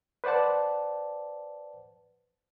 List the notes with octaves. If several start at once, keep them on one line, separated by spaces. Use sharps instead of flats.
B4 C5 D5 F#5 A5